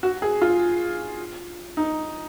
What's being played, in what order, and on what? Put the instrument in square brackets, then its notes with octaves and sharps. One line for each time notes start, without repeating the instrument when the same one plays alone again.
[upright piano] F#4
G#4
F4
D#4